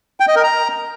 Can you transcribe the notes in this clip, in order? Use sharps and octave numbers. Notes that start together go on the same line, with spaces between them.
G5
D#5
A#4
A#5